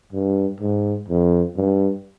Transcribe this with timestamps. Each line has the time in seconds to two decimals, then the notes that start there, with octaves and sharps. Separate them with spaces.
0.13 G2
0.60 G#2
1.09 F2
1.57 G2